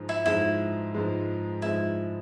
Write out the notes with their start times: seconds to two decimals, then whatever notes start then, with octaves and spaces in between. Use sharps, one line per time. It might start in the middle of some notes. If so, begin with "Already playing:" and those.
Already playing: G#2 F3 G#3
0.09 E4
0.26 G#2 F3 G#3 E4
0.94 G#2 F3 G#3
1.62 G#2 F3 G#3 E4